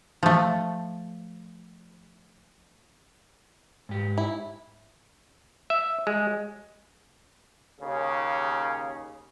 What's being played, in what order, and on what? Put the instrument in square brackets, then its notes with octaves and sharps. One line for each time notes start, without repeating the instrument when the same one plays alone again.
[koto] F3 A3
[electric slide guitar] G#2 G4
[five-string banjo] E4
[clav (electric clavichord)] E5
G#3
[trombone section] D#2 C#3